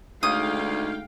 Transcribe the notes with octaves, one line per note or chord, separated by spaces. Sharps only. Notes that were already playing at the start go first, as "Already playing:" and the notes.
D2 G#3 A3 D#4 F5 G5 D#6